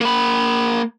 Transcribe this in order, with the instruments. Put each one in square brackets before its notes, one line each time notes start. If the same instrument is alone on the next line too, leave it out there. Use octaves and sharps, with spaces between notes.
[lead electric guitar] A#3 B5